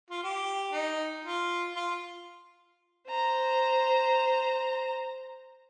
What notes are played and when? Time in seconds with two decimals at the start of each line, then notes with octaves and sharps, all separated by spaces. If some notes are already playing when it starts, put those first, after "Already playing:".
0.11 F4
0.23 G4
0.72 D#4
1.25 F4
1.76 F4
3.08 C5 A#5